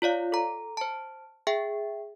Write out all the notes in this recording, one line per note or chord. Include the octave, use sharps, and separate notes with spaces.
F4 C#5 D5 F5
A4 A#5
C5 A5
G#4 E5 G5